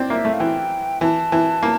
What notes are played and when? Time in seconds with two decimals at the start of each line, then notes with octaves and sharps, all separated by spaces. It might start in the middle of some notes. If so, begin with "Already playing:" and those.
Already playing: C4 D4
0.10 A#3 E5
0.25 A3
0.33 F5
0.40 E3 G5
1.01 E3 A5
1.32 E3
1.63 A#3